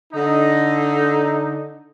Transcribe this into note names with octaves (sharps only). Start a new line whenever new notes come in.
D3 D#4